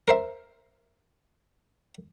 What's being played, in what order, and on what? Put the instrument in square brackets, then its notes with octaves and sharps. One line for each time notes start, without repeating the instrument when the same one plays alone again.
[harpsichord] A#4 C5 E5